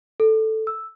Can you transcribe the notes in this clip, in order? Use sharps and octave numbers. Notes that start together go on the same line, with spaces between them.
A4
E6